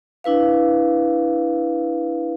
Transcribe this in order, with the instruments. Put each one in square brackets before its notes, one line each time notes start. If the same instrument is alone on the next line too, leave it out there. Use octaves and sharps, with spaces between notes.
[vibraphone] D4 E4 B4 F5